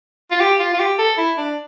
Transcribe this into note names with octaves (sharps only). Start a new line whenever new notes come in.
F4
G4
F4
F4
G4
A4
E4
D4